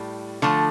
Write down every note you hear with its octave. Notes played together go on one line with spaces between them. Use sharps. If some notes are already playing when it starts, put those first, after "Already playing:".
Already playing: A2 G3
D3 F3 A3